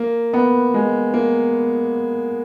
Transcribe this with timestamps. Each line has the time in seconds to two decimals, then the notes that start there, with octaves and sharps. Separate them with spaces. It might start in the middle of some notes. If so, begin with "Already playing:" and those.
Already playing: A#3
0.34 B3
0.74 G#3
1.14 A#3